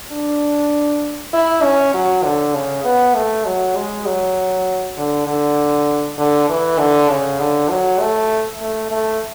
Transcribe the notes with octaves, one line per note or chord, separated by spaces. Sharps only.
D4
E4
C#4
F#3
D3
C#3
B3
A3
F#3
G#3
F#3
D3
D3
D3
E3
D3
C#3
D3
F#3
A3
A3
A3